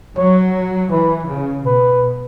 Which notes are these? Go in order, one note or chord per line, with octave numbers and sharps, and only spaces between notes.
F#3 C#5
E3 B4
C#3
B2 B4